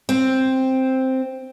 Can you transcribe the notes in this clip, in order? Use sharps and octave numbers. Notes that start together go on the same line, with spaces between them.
C4